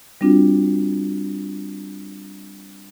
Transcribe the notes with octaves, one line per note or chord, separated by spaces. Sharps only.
G3 C4 D4 F4 F#4